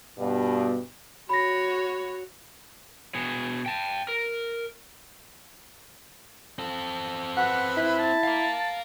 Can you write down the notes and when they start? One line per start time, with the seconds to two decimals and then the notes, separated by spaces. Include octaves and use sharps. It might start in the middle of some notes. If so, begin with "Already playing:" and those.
0.18 G2 B2
1.29 F#4 C#5 B5 A#6
3.15 B2 G#4
3.66 G5 A5
4.08 A#4
6.59 C4 A4
7.37 B4 F#5
7.77 E4
7.99 A5
8.23 F5 A#5